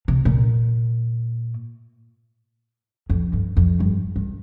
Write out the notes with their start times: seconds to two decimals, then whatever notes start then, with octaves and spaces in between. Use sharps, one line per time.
0.08 C3
0.25 A#2
3.10 F2
3.33 G2
3.57 F2
3.80 G2
4.16 G2